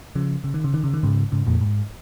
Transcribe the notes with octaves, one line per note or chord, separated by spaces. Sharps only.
C#3 F3
C#3
D#3
C#3
D#3
C#3
D#3
G#2 C#3
G#2 C#3
F2 A#2
G#2